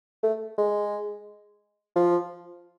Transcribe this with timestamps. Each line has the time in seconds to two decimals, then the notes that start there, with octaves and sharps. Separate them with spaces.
0.23 A3
0.58 G#3
1.96 F3